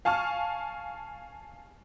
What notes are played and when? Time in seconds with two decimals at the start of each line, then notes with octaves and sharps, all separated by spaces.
0.05 F5 G#5 A5 C#6 F6